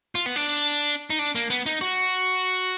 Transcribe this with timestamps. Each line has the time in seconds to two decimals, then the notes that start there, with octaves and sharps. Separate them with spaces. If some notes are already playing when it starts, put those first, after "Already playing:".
0.15 F4
0.26 B3
0.36 D4
1.10 D#4
1.19 D4
1.35 A#3
1.50 B3
1.66 D#4
1.81 F#4